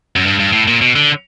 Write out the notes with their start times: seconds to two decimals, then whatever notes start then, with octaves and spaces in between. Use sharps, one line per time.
0.16 F#2
0.26 G2
0.40 G2
0.53 A2
0.67 A#2
0.81 B2
0.96 D3